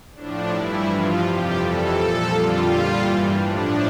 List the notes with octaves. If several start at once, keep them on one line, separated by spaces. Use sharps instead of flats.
A2 F3 D4
G2 E3 G3 E4
G2 F3 F4
F2 C3 G3 G4
F2 E3 G3 A4
A#2 F3
F2 D3 G3 F4
A#2 G3
G2 E3 G3
A2 F3 D4